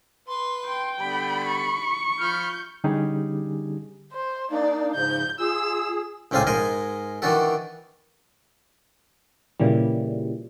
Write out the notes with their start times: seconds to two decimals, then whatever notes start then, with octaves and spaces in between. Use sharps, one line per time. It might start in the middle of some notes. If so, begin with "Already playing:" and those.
0.28 B4 C6
0.67 G5 C6
0.99 D3 G3 B3 B5
1.45 C#6
2.20 F3 B5 F6 G6
2.84 D3 G3 C#4 D#4 G4 G#4
4.13 C5
4.51 A#3 D4 D#4 D5
4.95 G#2 C#3 F3 G6
5.39 F4 G#4 E6
6.31 C#2 A2 C4 D4 F5 G#5
6.47 G#2 A#4 D#5 G#5 C6
7.22 D#3 E3 D4 F#4 A4
9.60 A#2 C#3 E3 G3